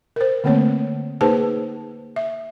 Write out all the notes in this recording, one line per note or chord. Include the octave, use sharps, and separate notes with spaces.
A#4 C5
D3 A3 A#3 C4 C#5
A#3 D#4 G#4 B4 C5 A5
E5